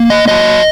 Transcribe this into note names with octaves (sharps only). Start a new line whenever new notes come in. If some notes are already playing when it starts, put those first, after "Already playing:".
Already playing: A#3
D#5
F#3 D#5